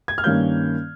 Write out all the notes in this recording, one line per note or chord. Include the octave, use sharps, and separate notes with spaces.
G#6
F6
G2 D#3 A#3 C#4 G6